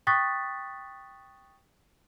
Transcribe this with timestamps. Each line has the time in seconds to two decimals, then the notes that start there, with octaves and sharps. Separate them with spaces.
0.07 G5 C#6 D#6 F#6 A6 B6